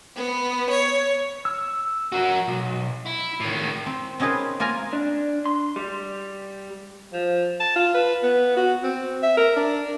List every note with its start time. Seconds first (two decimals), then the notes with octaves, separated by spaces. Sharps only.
0.16 B3
0.70 C#5
1.45 E6
2.12 F#4 A#4
2.47 B1
3.06 E4
3.40 A2 D#3
3.86 C4
4.20 C4 C#4 D#4 G#4 A#4 B4
4.60 A#3 F4 A#4 G#5 A#5
4.93 D4
5.46 C6
5.76 G3
7.13 F3
7.60 A5
7.76 F4
7.94 B4
8.23 B3
8.57 F#4
8.83 C4
9.23 E5
9.37 A#4
9.56 D4